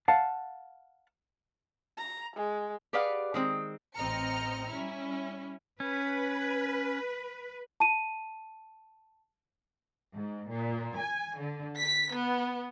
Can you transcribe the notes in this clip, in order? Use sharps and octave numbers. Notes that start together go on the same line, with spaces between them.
F5 F#5 A5
A#5
G#3
G4 G#4 B4 D5 F5 F#5
D#3 G#3 C4
A1 C4 D#5 A#5 F6 C#7
G3 C#4 E4
C#4 B4
A5 D#7
G#2
A#2
G#5
D3
B6
B3